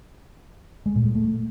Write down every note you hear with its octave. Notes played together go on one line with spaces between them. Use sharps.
G#3
A#2
G#3
A3